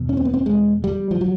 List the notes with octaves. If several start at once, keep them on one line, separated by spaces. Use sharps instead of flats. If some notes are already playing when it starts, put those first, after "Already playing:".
Already playing: E2 B2
C#4
C4
B3
C4
G#3
G3
F3
F#3